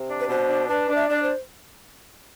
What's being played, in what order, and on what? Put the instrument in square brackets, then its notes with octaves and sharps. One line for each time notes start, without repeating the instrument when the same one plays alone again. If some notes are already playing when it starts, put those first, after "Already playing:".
Already playing: [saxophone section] C3
D4
[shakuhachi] B4
[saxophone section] B2 [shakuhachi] C5
[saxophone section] D4
[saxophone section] D4 [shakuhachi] B4
[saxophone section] D4
[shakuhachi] E5
[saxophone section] D4 [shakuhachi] D5
[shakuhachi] C5